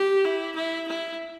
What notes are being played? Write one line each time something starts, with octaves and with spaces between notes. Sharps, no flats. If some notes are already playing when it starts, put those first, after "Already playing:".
Already playing: G4
E4
E4
E4